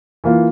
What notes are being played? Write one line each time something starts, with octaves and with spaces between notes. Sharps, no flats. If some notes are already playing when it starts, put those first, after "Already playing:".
E3 A#3 F4